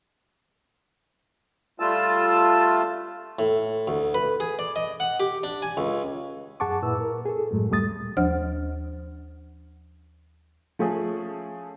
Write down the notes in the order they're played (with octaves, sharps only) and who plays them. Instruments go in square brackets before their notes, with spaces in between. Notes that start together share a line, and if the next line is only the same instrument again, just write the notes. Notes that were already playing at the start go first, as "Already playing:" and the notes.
[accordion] G3 A3 F4 A5 E6
[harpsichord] A2
D2
B4
G#4
D5
D#5
F#5
G4
D4
G#5
C#2
[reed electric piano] F#2 G#4 F#5 A5 C#6 D6
A#2 E4 B4 E6
A#4
G#4 A4
F#2 A2 F#3 G#3 A3
D2 A#2 G3 A3 D#6 A6
[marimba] D#2 F3 D4 C5 F#5 F6
[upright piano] F3 A3 C#4 G#4